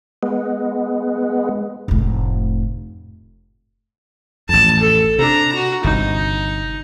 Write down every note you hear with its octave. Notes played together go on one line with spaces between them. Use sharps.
G#3 B3
F1 A2
A1 F2 A5
A4
C3 D4 A#5
F#4
G1 C3 D#4